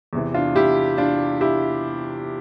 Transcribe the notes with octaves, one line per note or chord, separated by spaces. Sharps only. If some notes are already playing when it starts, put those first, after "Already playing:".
E2 C3 E3
D4 F4
E4 G4
D4 F4
E4 G4